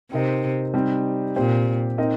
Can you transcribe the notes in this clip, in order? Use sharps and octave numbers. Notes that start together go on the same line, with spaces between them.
C3 C4 D#4 A#4 D#5
G3 C4 D#4
A#2 C4 G4 C5
C4 D#4 A#4 D#5